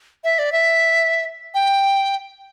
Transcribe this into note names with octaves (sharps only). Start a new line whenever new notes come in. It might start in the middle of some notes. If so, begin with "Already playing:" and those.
E5
D5
E5
G5